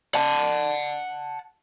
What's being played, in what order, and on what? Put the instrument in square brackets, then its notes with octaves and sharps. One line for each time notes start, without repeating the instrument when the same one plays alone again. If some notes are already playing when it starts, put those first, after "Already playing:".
[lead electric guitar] F#5 A5